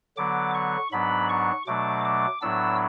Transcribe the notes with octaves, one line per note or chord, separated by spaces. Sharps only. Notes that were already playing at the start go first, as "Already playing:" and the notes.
D3 F#3 B3 D6
C#6
G#2 F#3 B3 D4 B5
C#6
B2 F#3 A3 D4 D6
D6
A2 F#3 B3 D4 E6